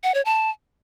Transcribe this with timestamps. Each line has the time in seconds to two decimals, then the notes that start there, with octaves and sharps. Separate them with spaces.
0.03 F#5
0.14 C#5
0.25 A5